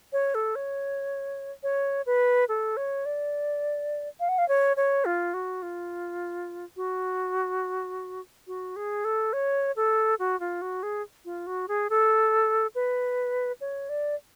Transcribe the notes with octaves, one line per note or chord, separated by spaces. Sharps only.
C#5
A4
C#5
C#5
B4
A4
C#5
D5
F5
F#5
F5
C#5
C#5
F4
F#4
F4
F#4
F#4
G#4
A4
C#5
A4
F#4
F4
F#4
G#4
F4
F#4
G#4
A4
B4
C#5
D5